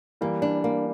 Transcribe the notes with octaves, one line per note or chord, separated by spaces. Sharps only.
E3 G3 A#3
D4
A#3